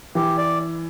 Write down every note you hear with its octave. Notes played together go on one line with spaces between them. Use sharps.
E3 G4
D5